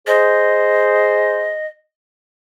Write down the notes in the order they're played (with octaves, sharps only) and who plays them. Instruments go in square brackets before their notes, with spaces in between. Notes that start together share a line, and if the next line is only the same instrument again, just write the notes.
[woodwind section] G#4 C5 [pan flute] D#5